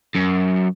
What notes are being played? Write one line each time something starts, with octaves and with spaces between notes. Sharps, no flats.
F#2